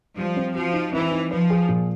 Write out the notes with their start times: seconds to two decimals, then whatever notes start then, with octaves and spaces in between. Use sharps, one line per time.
0.17 F3 G3
0.36 C4
0.55 F3 F#4
0.73 D#4
0.92 E3 C4
1.12 D#4
1.30 F3 B4
1.50 G#4
1.68 A#2